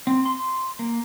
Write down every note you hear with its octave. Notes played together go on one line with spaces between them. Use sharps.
C4
C6
A#3